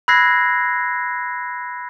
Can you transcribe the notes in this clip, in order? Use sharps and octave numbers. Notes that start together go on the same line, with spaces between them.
B5 E6 F#6 G#6 A#6 C7